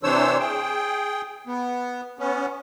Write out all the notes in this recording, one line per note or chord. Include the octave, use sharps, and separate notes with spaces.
C3 E3 D4 C5 C#5 E6
G#4 G5
B3
B3 C#4